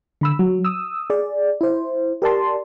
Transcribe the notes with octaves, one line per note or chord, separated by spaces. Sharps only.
D3 B5 E6
F#3
D#6 E6
G#4 D5
E4 C5
G4 A#4 D5 A5 C6